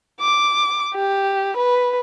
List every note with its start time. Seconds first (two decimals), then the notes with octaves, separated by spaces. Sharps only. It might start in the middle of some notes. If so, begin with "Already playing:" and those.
0.21 D6
0.94 G4
1.57 B4